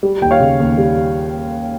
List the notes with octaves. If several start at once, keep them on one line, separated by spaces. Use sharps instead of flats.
G3
D#2 G5
C#5 F5
C#3
D#2
G3